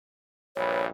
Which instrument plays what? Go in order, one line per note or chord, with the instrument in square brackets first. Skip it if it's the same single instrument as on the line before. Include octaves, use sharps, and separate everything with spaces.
[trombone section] A#1 G2 B4 [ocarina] C#5